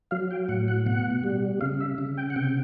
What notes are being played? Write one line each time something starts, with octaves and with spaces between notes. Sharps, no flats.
F#3 F5
G5
A2 F#5
F#5
B2 F#5
G3
C#3 F5
E5
C#3
G5
F#5
C3 G5